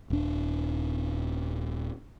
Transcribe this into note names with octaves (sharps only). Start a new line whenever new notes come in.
D#1 D4